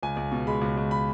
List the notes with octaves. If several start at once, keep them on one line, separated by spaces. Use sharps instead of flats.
C#2 G#5
C#2
B2
G#3 B5
C#2
C#2
B5